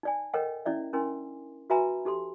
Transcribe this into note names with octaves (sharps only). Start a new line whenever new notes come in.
D#4 D5 G#5
A4 A#4 C#5 D#5 F#5 G5
C#4 E4 D5 E5
C#4 D4 E4 A#4 G#5 C6
F#4 B4 E5 G#5 A#5 B5
D#4 G4 A4 C6